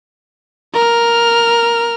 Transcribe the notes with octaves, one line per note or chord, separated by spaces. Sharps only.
A#4 F6